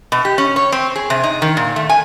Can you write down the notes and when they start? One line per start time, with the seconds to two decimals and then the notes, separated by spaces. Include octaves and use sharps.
0.12 B2
0.25 G4
0.38 C#4
0.56 C#5
0.72 C4
0.96 G#4
1.10 C3
1.23 D#4
1.42 D#3
1.57 A#2
1.76 A3
1.89 G#5